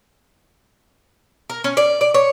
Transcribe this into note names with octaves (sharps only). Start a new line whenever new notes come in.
A#4
C#4
D5
D5
C#5